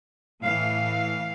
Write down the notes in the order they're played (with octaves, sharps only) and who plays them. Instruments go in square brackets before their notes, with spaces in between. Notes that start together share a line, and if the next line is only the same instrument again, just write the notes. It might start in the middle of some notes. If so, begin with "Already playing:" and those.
[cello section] A2 E3 F5